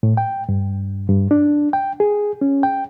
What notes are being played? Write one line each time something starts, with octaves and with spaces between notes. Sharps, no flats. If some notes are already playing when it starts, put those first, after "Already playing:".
A2
G5
G2
G2
D4
G5
G#4
C#4
G5